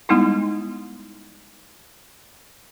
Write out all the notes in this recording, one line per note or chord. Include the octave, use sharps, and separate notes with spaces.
G3 G#3 B3 D#4 E4